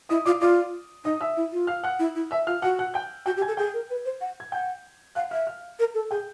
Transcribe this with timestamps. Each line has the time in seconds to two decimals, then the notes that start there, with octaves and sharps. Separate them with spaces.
0.09 E4 D#5 D#6
0.25 F4 D5 D6
0.41 F4 D5 D6
1.05 D#4 D#5 D#6
1.21 E5 E6
1.37 E4
1.52 F4
1.67 F5 F6
1.84 F#5 F#6
1.99 E4
2.15 E4
2.31 E5 E6
2.47 F4 F5 F6
2.62 F#4 F#5 F#6
2.79 F#5 F#6
2.94 G5 G6
3.26 F#4 G5 G6
3.37 G4
3.42 G#5 G#6
3.48 A4
3.57 G#4 G5 G6
3.74 A#4
3.90 B4
4.05 C5
4.21 F#5
4.40 G#6
4.52 F#5 G5 G6
5.15 F5 F#5 F#6
5.31 E5 F5 F6
5.47 F5 F6
5.79 A#4
5.94 A4
6.11 G#4 G5 G6